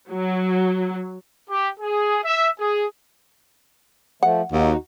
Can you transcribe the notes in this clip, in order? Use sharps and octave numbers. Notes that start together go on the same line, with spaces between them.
F#3
G4
G#4
E5
G#4
F3 A3 F#5
D#2 D#4 F#4